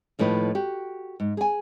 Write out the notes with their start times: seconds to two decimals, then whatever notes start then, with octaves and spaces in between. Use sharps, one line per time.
0.19 D#2 A2 F3 B4 D#5
0.55 F#4 G4
1.20 G#2
1.37 G#4 G#5